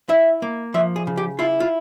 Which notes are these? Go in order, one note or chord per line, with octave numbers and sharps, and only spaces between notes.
E4 E5
A#3
F3 E5
G#4
C#3
G4
E4 F4
F4